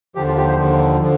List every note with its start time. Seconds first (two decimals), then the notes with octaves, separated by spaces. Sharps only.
0.15 D#2 D3 F3 G4
0.27 F4
0.37 G4
0.48 C5
0.57 D#2 D3 F3
1.01 D3 F3